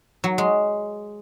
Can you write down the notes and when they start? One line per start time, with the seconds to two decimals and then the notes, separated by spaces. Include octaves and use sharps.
0.24 F#3
0.38 G#3